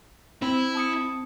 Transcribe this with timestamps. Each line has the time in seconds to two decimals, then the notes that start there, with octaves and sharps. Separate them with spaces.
0.42 C4 E4
0.75 A5 D#6 C#7